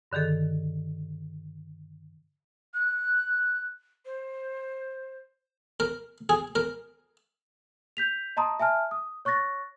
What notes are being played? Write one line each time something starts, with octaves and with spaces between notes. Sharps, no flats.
G2 D3 D#3 G#4 A4
F#6
C5
A#4
G#4
A#4
G6 B6 F7
D#5 A5 A#5 C6 D#6
E5 G#5 A5 F6
D#6
C#5 C#6 F#6 A6 A#6